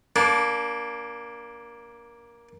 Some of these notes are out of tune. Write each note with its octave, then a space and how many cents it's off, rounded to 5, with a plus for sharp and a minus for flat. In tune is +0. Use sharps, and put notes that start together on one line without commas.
A#3 +15 D4 -25